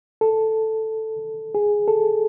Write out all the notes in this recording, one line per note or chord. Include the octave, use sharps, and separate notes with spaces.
A4
G#4
A4